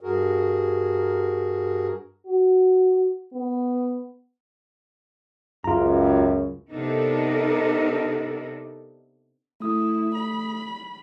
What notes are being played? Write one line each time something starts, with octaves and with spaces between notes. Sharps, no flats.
G2 F#4 G#4 A#4
F#4
B3
C#2 F#2 F4 A#5
C3 B3 D4 D#4 A4 A#4
A3 E4 D#6
B5